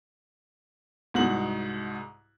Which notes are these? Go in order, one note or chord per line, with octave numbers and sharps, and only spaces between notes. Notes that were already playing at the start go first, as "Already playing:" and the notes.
C2 G#2 F#4 F#7